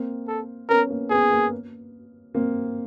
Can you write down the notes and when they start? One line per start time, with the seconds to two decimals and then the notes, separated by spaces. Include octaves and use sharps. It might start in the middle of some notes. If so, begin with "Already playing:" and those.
Already playing: A#3 C4
0.28 A4
0.69 B3 C#4 A#4
0.90 A#3
1.10 B3 G#4
1.31 A#3
2.34 A#3 C4